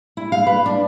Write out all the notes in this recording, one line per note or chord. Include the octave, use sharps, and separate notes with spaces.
E4
F5
B4
D4